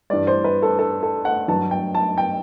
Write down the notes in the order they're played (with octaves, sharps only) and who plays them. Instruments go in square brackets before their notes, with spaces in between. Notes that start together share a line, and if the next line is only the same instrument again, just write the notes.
[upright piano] G2 E3 G3 D5
C5
B4
A4
A4
A4
F#5
G2 F#3 A5
G5
A5
G5